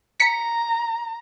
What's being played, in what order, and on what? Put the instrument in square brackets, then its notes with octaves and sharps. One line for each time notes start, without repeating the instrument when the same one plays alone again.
[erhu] A#5 [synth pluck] B6 C#7